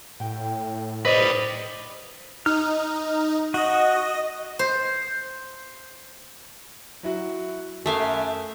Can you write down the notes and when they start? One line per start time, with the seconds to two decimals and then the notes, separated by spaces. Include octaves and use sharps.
0.20 A2 G5
1.05 B4 C5 D5 D#5
2.46 D#4 F6
3.54 F#4 D#5
4.59 C5
7.03 F#3 E4 F#4
7.86 F#2 A3 E5 F5 G#5 A5 D#6